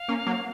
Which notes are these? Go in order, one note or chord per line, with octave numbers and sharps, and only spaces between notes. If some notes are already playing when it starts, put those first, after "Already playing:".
Already playing: F5
A#3 C#4
F#3 A#3